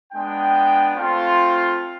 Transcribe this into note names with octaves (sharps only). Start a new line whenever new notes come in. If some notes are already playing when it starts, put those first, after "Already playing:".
G#3 B3 D4 G5
A3 C4 F4